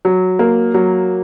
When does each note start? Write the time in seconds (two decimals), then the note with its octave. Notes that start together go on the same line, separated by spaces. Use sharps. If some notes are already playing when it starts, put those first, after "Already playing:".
0.05 F#3
0.39 A#3
0.74 F#3